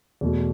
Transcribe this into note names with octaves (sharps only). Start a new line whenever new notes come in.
E2 B2 A3 F#4